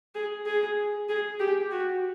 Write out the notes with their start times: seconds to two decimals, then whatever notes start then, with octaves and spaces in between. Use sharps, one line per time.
0.15 G#4
0.46 G#4
1.09 G#4
1.40 G4
1.71 F#4